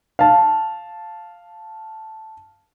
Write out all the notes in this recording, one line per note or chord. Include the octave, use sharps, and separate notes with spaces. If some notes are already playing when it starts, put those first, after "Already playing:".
F5 A5